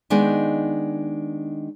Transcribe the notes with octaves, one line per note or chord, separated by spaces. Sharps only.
D#3 G#3 B3 D4 D#4